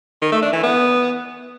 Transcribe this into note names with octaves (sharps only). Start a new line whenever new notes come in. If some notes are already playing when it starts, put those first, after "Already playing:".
D#3
A3
D4
E3
B3